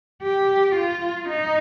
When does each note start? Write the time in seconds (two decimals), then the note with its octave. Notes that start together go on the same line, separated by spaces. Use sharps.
0.22 G4
0.75 F4
1.29 D#4